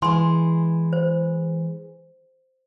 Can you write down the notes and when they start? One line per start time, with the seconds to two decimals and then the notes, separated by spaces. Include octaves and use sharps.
0.02 E3 G#3 G#5 C6
0.93 C5